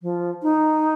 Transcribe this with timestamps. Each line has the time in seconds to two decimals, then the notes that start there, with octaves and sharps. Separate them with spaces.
0.02 F3
0.43 D#4